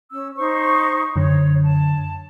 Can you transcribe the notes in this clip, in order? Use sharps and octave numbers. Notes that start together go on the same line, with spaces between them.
C#4 E6
D#4 C5 C#6
F#2 D3 C#5
A5